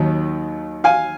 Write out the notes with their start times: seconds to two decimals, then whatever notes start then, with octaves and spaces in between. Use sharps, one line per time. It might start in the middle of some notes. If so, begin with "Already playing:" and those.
Already playing: D#2 D#3 F#3
0.84 F5 G#5